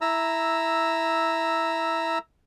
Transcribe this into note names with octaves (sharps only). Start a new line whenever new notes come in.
E4 A#5 E6